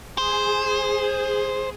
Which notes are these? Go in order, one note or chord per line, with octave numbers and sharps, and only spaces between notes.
G#4 C5